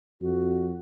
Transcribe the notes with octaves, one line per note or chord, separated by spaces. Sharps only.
F2 F#4